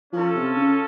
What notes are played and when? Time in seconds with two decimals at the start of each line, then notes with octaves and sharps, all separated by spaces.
0.13 F3 C#4 F4 A4
0.35 C3
0.57 C#3